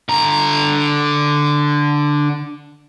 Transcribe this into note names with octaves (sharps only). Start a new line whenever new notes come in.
D3 A#5